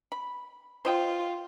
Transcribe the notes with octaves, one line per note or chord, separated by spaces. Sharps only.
B5
F4 C5 D#5 G5